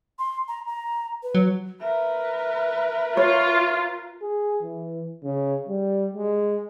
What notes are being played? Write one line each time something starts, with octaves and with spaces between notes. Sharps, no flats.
C6
A#5
A#5
B4
F#3
A#4 B4 E5
F4 C#5
G#4
E3
C#3
G3
G#3